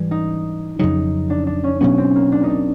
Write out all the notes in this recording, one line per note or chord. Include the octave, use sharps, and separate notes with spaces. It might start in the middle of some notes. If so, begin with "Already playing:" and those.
Already playing: G#2 E3 G3
D#4
F2 C#3 F#3 D#4
D4
D4
C#4
B2 F#3 B3 C#4
C4
A#3
D4
D#4
D4